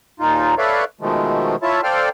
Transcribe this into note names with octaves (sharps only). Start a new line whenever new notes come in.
D#2 A#2 D#4 F4
A4 B4 C#5 D5 E5 F5
B2 D#3 F3 G#3 A3
E4 F4 C#5 E5 A5
A4 C5 D5 F5 G5 F6